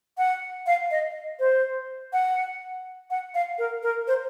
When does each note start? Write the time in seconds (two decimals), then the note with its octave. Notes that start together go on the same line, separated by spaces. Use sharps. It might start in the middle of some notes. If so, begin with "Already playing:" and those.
0.18 F#5
0.67 F5
0.91 D#5
1.40 C5
2.13 F#5
3.10 F#5
3.35 F5
3.59 A#4
3.83 A#4
4.07 C5